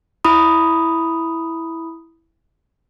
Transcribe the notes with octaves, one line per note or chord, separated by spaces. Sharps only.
E4 B5 D#6